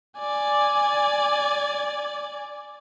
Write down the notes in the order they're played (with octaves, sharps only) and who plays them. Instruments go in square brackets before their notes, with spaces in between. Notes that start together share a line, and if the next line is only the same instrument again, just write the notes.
[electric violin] D5 G#5